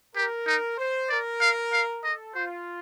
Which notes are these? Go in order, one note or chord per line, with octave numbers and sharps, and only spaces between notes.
G4 A#4
D#4
C5
A#4 D5
F5
F5
A4 D#5
F4 C5